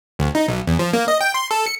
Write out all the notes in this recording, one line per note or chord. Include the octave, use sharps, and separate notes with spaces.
D2
D#4
B1
E2
F3
A#3
D#5
G5
C6
A4
C#7